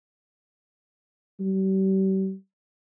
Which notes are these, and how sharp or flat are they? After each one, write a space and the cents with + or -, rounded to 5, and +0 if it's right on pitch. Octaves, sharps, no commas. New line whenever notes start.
G3 -40